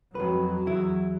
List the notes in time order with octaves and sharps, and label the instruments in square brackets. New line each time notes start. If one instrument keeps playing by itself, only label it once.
[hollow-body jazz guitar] F2 B4 [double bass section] F#3
[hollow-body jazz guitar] E2 E4